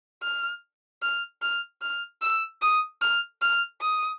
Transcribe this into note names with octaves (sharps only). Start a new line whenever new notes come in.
F6
F6
F6
F6
E6
D#6
F6
F6
D#6